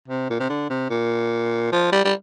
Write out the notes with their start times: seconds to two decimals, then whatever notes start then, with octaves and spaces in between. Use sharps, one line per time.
0.08 C3
0.30 A#2
0.40 C3
0.49 D3
0.70 C3
0.90 A#2
1.72 F3
1.92 G3
2.05 G3